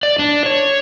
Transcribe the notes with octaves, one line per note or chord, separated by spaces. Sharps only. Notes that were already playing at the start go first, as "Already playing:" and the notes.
D5
D4
C#5